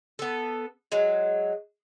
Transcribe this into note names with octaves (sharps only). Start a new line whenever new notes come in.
B3 A4
F#3 G#3